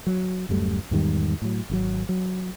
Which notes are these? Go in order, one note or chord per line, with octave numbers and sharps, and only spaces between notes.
F#3
D1 F#2 G3 A3
E2 G#2 D#3 G3
A2 F#3
G#1 C#3 F#3
F#3